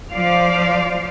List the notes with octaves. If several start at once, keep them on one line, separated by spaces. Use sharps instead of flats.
F3 C5 D5 F5